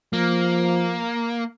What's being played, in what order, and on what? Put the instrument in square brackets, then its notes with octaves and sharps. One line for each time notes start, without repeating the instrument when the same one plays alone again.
[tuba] F3 [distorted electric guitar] A#3